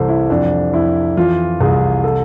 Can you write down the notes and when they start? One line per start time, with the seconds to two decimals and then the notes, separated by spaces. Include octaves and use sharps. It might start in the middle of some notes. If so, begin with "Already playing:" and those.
Already playing: C2 E3 A4 C5
0.09 E4
0.30 F2 D4
0.73 F2 E4
1.17 E3 F4
1.61 C2 G#4
2.04 A4